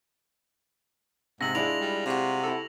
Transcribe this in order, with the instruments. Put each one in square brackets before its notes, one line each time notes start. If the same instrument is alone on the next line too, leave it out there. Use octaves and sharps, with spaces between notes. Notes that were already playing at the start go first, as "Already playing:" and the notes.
[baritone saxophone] G#2 [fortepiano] C3 [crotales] A#6 F#7
[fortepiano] G#3 D4 E4 [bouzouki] F4 [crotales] F7
[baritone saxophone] G3
[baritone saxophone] C3 [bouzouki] F4 F#4
[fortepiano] E4 A4